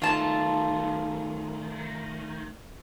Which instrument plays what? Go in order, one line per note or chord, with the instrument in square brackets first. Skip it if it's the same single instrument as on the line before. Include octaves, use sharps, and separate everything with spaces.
[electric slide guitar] D#3 A3 [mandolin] F4 A5